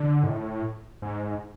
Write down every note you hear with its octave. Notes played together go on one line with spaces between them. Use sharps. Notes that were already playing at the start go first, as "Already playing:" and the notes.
Already playing: D3
G#2
A2
G#2